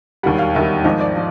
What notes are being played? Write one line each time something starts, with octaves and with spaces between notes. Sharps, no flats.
E1 D#2 D#3 G3 F#5
F5
E1 D#2 D#3 G3 E5
G#1 G#2 F3 D#5
D5
F3